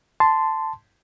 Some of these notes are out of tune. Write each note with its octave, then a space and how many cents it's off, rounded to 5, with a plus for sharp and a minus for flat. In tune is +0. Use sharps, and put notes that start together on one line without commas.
A5 +0 C6 -15